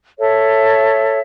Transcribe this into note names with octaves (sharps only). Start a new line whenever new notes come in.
A4 C#5 E5